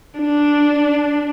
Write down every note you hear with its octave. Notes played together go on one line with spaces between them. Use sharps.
D4